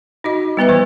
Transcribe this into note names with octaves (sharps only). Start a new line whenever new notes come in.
D#4 F#4 D#5
G3 B3 B4 E5
E3 G3 B3 C5